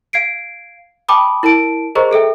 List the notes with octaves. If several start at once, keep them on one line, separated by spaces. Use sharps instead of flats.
F5 G#6 C7 D7
G5 A5 B5 D6 D#6
E4 A#4 A5 D7
G#4 A#4 C5 D#5 A#5 C#6
G#4 A4 E5 G5